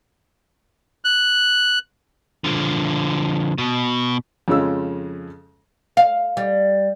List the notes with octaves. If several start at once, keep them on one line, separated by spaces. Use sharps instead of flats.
F#6
D3 F3
B2
F2 C#3 F3 G#3 C#4 E6
F5
G3